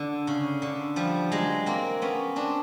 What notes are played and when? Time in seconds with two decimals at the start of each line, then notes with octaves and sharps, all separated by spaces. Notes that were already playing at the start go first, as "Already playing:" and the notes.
Already playing: D3
0.27 C#3
0.62 D3
0.96 F3 G3
1.32 F#3 G#3
1.66 A#3 C4
2.02 B3 C#4
2.36 C4 D4